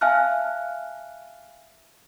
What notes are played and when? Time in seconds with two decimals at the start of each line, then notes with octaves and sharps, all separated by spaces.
0.01 E5 F5 G#5 A5 F6 F#6